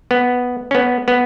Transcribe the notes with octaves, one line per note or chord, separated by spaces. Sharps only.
B3
C#4
B3
B3